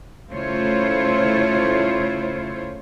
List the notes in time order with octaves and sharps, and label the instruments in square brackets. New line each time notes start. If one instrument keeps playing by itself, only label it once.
[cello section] C#3 A3 E4 F4 C5 C#5